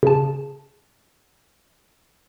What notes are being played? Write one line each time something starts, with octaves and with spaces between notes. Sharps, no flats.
C#3 A5